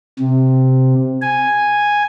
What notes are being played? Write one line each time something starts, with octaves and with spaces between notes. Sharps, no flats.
C3
G#5